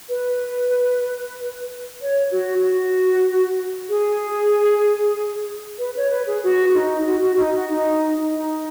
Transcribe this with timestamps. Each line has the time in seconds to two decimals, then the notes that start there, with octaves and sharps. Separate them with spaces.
0.09 B4
2.00 C#5
2.31 F#4
2.62 F#4
3.89 G#4
5.79 B4
5.96 C#5
6.11 B4
6.27 G#4
6.43 F#4
6.74 D#4
7.05 F#4
7.22 F#4
7.38 D#4
7.54 F#4
7.69 D#4
8.32 D#4